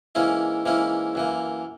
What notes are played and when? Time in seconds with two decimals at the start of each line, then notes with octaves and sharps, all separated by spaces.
0.15 G#2 E3 A#3 C#4 E4
0.65 G#2 E3 A#3 C#4 E4
1.15 F#2 E3 A#3